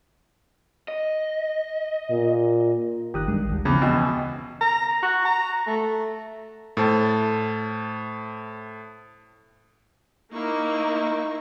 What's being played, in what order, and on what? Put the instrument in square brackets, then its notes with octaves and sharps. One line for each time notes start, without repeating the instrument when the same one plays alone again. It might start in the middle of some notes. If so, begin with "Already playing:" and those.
[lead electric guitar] D#5
[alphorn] A#2
[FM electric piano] G1 D#3 F#6 [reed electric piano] G4 A#4 D#6
[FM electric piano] A#1 G#3 [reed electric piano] G2
[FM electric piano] D2 D#3
[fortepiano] E2 [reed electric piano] C#3 [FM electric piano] E3 F3 C4
[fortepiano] B2 [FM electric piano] G5 G#5 E6
[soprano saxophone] A#5
F#4
A#5
A3
[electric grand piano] A2 A4 C5 A5
[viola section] A#3 [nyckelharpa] D#4 [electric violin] E4 C#6